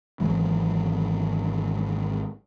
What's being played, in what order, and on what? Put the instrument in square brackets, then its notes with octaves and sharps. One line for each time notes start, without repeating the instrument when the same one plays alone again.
[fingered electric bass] G#1 E3 F#3